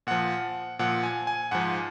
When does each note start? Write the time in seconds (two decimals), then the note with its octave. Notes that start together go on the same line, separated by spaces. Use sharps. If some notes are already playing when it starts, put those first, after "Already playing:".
0.07 A#2 F3 F#5
0.79 A#2 F3 F#5
1.03 G#5
1.27 G#5
1.51 G#2 F3 F#5